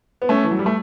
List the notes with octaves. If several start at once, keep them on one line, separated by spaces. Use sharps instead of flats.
B3
A3 C#4
E3
F#3
G3
A3